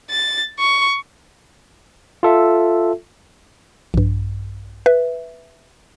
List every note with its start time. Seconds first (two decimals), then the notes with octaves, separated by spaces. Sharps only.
0.10 A6
0.60 C#6
2.23 F4 A4 E5
3.94 A#1 G2
4.86 B4 E5